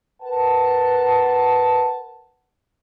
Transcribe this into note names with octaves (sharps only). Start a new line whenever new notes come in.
A#4 B4 F#5 A5